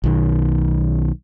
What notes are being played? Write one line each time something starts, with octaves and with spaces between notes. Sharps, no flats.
B1 D#3